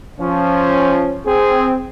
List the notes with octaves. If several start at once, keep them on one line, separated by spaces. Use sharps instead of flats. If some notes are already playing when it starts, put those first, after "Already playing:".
F3 C#4
C4 G#4